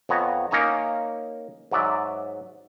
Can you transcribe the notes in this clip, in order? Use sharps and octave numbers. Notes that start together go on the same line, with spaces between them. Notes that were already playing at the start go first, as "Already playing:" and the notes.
F2 B3 C#5 A#5
A#3 C#4 D#4 C#5 A#5
G#2 F#3 D5 E5